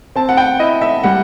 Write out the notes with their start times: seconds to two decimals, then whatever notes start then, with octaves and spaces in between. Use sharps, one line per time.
0.16 C4 A5
0.29 F#5
0.37 G5
0.59 E4 D#5
0.81 E5
1.03 G3 F#5